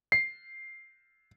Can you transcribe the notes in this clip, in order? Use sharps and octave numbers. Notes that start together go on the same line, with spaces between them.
C7